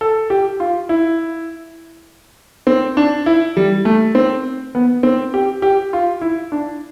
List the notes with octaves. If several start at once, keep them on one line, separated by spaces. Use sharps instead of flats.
A4
G4
F4
E4
C4
D4
E4
G3
A3
C4
B3
C4
G4
G4
F4
E4
D4